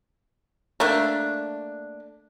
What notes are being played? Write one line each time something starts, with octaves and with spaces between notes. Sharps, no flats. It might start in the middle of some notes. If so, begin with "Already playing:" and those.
A3 A#3 D4